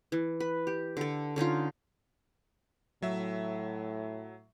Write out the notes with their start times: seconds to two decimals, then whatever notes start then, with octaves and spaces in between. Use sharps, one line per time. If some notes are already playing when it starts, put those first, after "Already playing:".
0.12 E3
0.40 B4
0.67 G4
0.97 D3 A4
1.36 D3 C#4 D#4 F4
3.02 A2 F#3 E5